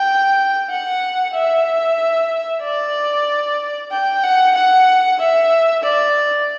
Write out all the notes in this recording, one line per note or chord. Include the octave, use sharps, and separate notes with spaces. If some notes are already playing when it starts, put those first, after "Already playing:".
Already playing: G5
F#5
E5
D5
G5
F#5
F#5
E5
D5